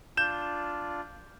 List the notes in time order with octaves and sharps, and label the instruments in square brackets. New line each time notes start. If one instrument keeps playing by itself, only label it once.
[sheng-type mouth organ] D4 F4 [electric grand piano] G6 E7